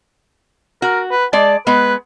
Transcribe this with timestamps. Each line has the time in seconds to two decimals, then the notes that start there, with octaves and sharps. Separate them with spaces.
0.82 F#4 A#4
1.11 B4
1.33 G#3 D5 A5
1.67 G#3 B3 B4